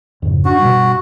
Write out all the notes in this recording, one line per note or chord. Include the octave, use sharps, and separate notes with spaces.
F2 G#2 C#3
D4 F#4
G2 B2